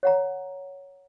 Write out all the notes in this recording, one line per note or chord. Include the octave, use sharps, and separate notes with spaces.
C#5 F#5 A#5